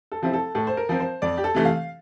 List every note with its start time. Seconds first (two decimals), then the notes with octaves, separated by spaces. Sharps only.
0.12 A4
0.22 C3 F3 C4 E4
0.33 A4
0.55 A2 A4
0.67 C5
0.77 A#4
0.89 F3 C4
1.00 C5
1.22 F2 D5
1.37 G4
1.44 A4
1.55 C3 E3 A3
1.65 F5